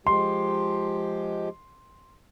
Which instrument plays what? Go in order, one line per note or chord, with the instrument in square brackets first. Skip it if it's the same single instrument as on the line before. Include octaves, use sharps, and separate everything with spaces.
[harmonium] F3 G#3 G4 [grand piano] C6